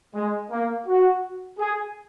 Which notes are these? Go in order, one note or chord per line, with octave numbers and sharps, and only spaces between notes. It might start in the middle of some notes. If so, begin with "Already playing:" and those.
G#3
A#3
F#4
G#4